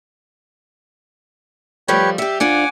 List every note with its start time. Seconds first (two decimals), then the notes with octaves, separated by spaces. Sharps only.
1.88 F3 G3 A3 G4 B4 C#5
2.18 G3 G4 E5
2.40 G#2 D4 F4 F#5 G#5 D6